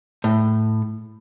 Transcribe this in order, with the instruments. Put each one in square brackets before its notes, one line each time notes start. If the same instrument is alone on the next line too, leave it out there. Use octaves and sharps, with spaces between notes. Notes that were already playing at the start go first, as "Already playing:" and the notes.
[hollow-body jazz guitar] A2